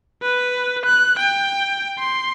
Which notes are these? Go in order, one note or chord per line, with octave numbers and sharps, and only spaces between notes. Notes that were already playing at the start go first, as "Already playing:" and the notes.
B4
F#6
G5
C6